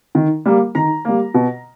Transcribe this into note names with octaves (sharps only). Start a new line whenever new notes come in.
D#3
G3 A#3
D#3 A#5
G3 A#3
B2